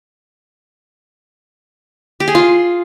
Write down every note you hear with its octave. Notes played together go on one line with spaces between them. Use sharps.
G4
G#4
F4